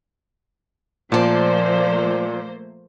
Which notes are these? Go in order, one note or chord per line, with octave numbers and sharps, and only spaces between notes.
A#2 F3 A3 A#3 C5 D5 A5